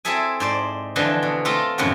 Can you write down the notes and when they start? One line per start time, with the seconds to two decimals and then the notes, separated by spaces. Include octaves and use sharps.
0.05 C4 E4 G#4 A4 E5 G#5
0.40 G#2 C5 D5
0.96 D3 E3 F3 C5 D#5 A5
1.23 B2
1.45 A3 C4 F4 A4 D#5 A#5
1.78 F#2 A2 C3 D#3 F3 F#3